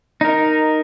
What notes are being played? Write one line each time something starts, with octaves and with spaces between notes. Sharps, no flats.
D#4 A#4